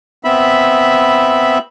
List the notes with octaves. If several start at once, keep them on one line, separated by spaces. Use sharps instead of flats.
B3 C4 E5 B5